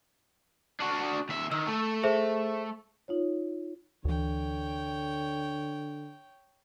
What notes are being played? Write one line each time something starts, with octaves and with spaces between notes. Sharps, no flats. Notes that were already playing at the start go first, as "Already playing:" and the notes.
D4 F#4
D#2 E5
D#3 E6
A3
G#4 C5 E5
D#4 F4 C#5
D2 D3 E3 C#5 G5